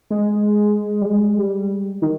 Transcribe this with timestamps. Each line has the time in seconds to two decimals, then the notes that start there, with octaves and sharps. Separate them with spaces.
0.10 G#3
1.01 G3
1.06 G#3
1.38 G3
2.02 D#3